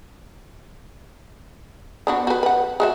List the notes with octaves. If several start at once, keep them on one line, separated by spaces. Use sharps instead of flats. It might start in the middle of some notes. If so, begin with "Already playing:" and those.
B3 D4 F#4
F#4 B4
B4 F#5
G#3 F#4 E5